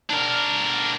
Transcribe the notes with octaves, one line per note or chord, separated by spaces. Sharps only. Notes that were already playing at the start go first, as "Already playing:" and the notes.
D4 A#4